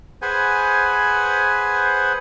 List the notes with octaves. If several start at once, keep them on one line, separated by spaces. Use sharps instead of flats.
G#4 B4 C5 F#5 G#5